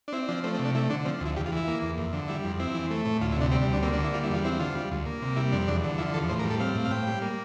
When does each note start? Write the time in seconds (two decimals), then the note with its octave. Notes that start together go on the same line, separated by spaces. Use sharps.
0.08 D4
0.13 C4 E4
0.28 F3 D4
0.44 A3 C4
0.54 C4
0.59 C3
0.65 D4
0.75 A3 E4
0.89 D3 D4
1.05 F3 C4
1.20 D2
1.26 E4
1.36 E2 G4
1.46 F4
1.52 E3 E4
1.68 A#3
1.82 E2
1.98 F2
2.13 D3
2.28 G3 E4
2.44 F2
2.59 C4 E4
2.75 E3
2.91 A3
3.05 A2
3.21 D2 F4
3.32 E4
3.36 C3 D4
3.52 G3 C4
3.62 D4
3.68 D2
3.73 D4
3.82 A#3 C4
3.93 D4
3.98 D3
4.04 E4
4.13 G3 F4
4.24 E4
4.30 E2 F4
4.44 C4 E4
4.59 D3 F4
4.75 G3
4.91 D2
5.06 A#3
5.22 C3
5.36 G3 E4
5.52 F2 D4
5.68 E2 D4
5.84 D3
5.98 F3 E4
6.14 E2 A4
6.29 A2 C5
6.39 A#4
6.44 G3
6.50 A4
6.60 C4 F5
6.75 A2
6.85 F5
6.91 A2 G5
7.07 G3
7.22 A#3